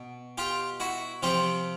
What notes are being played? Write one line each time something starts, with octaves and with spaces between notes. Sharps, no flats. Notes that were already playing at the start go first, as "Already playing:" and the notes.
Already playing: B2
F4 G4
E4 F#4
C3 F3 F4 G4